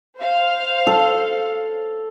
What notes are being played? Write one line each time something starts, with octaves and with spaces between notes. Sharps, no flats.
C5 F5
A4